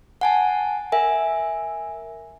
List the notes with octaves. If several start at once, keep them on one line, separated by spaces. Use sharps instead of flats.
F#5 G#5 A5
A#4 E5 G#5